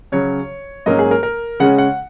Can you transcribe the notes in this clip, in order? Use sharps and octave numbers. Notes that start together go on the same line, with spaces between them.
C#3 F#3 C#4 C#5
G#2 F#3 A#3 C#4 D#5
G#4
A#4
A#4
C#3 G#3 C#4 F#5
F#5